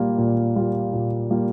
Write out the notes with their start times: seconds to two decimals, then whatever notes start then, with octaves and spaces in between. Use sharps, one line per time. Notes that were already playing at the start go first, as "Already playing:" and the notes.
Already playing: A#2 G3 A#3 F4
0.18 A#2
0.56 G3 A#3 F4
0.93 A#2
1.30 G3 A#3 F4